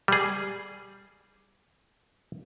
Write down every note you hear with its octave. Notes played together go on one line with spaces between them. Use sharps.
G3 G#4